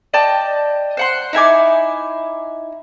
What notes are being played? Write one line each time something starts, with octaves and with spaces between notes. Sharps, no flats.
D5 D#5 G5 A5
C5 F#5 C6
D#4 E4 G#5 D6